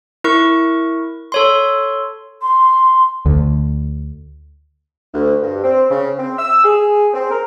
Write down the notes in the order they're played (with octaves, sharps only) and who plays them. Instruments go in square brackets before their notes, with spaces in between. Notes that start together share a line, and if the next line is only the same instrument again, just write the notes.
[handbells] E4 A#4 C#6
A4 C#5 C6
[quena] C6
[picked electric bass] D2
[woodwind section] D2
G2
C4
C#3
C4
E6
G#4
C4
A#4